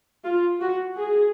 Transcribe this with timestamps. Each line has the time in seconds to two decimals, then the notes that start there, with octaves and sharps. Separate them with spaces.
0.25 F4
0.61 F#4
0.97 G#4